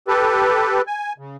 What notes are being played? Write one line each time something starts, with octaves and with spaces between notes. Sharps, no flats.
G4 A4 B4
G#5
C#3